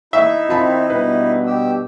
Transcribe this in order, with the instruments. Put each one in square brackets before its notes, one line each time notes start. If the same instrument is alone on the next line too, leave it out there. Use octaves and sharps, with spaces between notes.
[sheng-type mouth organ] D#4 E4 [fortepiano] E5
[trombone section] D#3 C4 [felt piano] F4 A5 B5
[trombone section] G2 B2 [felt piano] B4
[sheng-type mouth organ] G4 E6